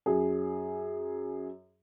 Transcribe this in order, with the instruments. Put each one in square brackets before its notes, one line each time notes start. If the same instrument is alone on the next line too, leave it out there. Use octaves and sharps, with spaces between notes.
[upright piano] F#2 G#4